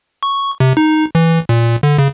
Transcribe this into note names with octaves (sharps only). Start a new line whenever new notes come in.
C#6
C3
D#4
E3
A#2
D3
C#3